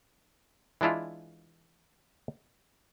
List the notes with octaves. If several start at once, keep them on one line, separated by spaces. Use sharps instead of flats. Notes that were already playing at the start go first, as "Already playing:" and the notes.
E3 G#3 D4 E4 F4